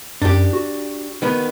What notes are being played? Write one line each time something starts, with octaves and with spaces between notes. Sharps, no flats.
F#2 D4 G4
F#4
D#3 B3